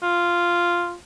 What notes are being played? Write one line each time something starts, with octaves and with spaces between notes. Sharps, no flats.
F4